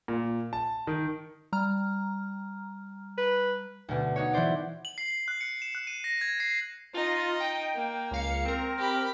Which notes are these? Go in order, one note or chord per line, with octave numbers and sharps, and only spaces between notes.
A#2
A5
D#3
G3 A#5 F6
B4
D2 B2
D#4 F#4 C#5
E3 E4 C5 D5
F#7
C7
F#7
F#6
C#7
E7
F#6
D#7
A#6
G#6
C7
D#4 F4 D#5
G5
A#3
C#2 F5 C#7
C4 A#4
G4 B5